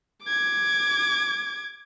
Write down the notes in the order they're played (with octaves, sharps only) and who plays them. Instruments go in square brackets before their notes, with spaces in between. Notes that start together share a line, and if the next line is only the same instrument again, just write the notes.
[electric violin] D6 G#6